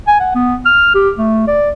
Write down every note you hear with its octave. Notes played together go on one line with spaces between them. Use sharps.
G#5
F#5
B3
F6
G4
A3
D5